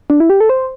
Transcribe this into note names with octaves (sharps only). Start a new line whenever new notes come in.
D4
E4
G4
A4
C5